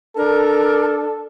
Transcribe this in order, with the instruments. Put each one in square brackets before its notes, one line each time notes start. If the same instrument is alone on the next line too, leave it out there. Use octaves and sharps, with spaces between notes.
[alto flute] D4 [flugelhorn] A4 [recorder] A#4